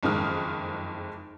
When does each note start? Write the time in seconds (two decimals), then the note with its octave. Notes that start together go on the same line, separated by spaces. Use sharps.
0.03 F#1 F2 D#3 G#3 D#6 F6